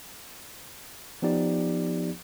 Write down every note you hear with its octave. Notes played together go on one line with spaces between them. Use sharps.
F3 B3 D#4 G4 D5